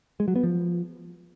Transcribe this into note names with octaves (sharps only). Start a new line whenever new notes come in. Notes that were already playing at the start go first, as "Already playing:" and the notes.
G#3
F#3
B3
F3